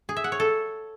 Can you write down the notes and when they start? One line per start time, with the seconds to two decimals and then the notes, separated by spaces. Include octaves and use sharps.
0.09 G#4
0.17 E5
0.24 F#5
0.32 C#5
0.40 A4